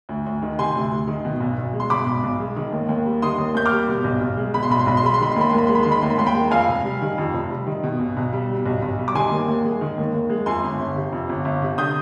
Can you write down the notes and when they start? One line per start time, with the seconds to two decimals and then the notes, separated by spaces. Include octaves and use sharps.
0.09 D2
0.26 D2
0.42 D#3
0.58 C3 G#5 C6
0.75 D2
0.92 D2
1.08 D#3
1.25 B2
1.41 B1
1.58 B1
1.73 G#3
1.80 C6
1.90 B2 B5 D6
2.06 B1
2.23 B1
2.40 G#3
2.56 D#3
2.72 D#2
2.89 D#2
3.06 G3
3.22 D#3 C6 D#6
3.38 D#2
3.55 D#2 G6
3.66 D6 F6
3.72 G3
3.89 B2
4.04 B1
4.21 B1
4.37 G#3
4.54 B2 B5
4.63 C6
4.70 B1 B5
4.79 C6
4.86 B1 B5
4.97 C6
5.03 G#3 B5
5.14 C6
5.20 D#3 B5
5.32 C6
5.36 D#2 B5
5.50 D#2 C6
5.58 B5
5.67 G#3 C6
5.75 B5
5.83 D#3 C6
5.92 B5
6.02 D#2 C6
6.10 B5
6.18 D#2 C6
6.26 G5 B5
6.35 G#3
6.51 F2 F5 G#5
6.68 F1
6.85 G3
7.02 D#3
7.18 F2
7.33 F1
7.50 G3
7.67 D#3
7.83 B2
8.00 B1
8.17 B1
8.33 G3
8.49 B2
8.66 B1
8.82 B1
8.98 G3
9.08 D6
9.15 D#3 G#5 C6
9.31 D#2
9.48 D#2
9.65 G#3
9.81 D#3
9.98 D#2
10.14 D#2
10.30 G#3
10.46 F2 G#5 C6
10.64 G1
10.79 G1
10.96 C3
11.13 F2
11.29 G1
11.45 G1
11.62 C3
11.78 D3 D#6 G6